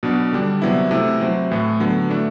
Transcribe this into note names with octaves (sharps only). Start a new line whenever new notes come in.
B2 F#3 B3 D4
D3 G3 D4
C3 F#3 B3 E4
C3 E3 A3 E4
F#3 C4 E4
A2 E3 A3
D3 F#3 B3
E3 A3 D4